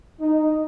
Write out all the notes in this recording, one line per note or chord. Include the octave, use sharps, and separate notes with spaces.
D#4